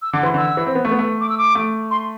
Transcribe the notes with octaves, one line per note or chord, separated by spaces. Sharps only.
E6
D3 D6
E3 C6
D3 E6
E3
C4
B3
A3
B3
A3
D6
E6
D6
A3
C6